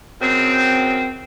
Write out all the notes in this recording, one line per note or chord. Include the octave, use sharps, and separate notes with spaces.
F#2 C#3 C4